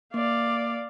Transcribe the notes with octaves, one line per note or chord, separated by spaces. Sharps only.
A#3 D5 F5